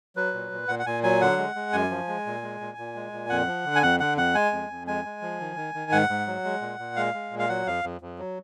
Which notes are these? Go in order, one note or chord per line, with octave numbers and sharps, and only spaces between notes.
F#3 B4
A#2
A#2
A#2 F#5
F#5
A#2 G#5
F#3 G#5
D3 F#5
G#3
G#3
F#2 G#5
F3
G#3
A#2
G#3
A#2
A#2
G#3
A#2
F2 F#5
F3
D3
G#5
F2 F#5
D3 F#5
F2 F#5
G#3 G#5
F2
F2
G#3 G#5
G#3
F3
D#3
D#3
D#3
G#2 F#5
G#2
F#3
G#3
A#2
A#2
G#3 F5
G#3
A#2
F5
F#3 F#5
F2 F5
F2
F2
F#3